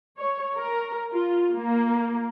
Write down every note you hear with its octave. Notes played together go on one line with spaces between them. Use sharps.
C#5
A#4
F4
A#3